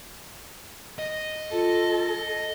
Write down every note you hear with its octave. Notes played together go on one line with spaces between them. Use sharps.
D#5
F4 A4